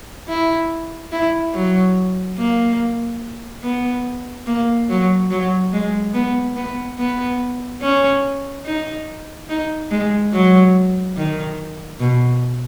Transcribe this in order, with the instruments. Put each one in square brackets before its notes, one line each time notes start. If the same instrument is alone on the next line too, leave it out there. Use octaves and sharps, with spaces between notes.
[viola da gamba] E4
E4
F#3
A#3
B3
A#3
F#3
F#3
G#3
B3
B3
B3
C#4
D#4
D#4
G#3
F#3
D#3
B2